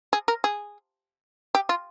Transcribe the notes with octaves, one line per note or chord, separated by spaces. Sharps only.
G#4
A#4
G#4
G4
F4